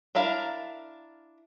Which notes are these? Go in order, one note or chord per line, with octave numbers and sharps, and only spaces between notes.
D4 E4 A#4 F5